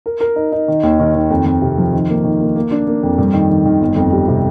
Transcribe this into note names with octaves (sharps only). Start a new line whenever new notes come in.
A#4
A#4
D#4
D#4
D#3
D#2
D#3
D#3
F2
F2
C3
F3
D#3
A#3
D#3
A#3
A#3
D4
A#3
F2
G2
D#3
D#3
D#3
G1
F2
G3
C3